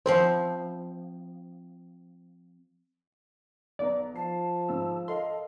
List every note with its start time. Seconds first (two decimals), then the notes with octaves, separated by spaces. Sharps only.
0.06 F3 C4 E4 C5
3.79 B1 B3 D5 A#5
4.16 F3 A5 C7
4.69 G#2 E6
5.08 A4 A#4 D#5 F5 C6